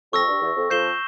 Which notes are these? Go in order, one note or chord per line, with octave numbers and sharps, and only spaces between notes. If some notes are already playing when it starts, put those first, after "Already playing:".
F2 C#6 E6 A#6
G2
E2
F2
F2 G6 C7 E7 G7